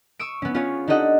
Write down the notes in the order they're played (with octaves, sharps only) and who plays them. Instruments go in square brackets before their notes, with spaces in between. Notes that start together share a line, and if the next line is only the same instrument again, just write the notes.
[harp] C#6 D#6 E6 D7
B3 C#4
C#4 F4 G#4 B4 C#5
D4 D#4 G4 A4 D#5 F#5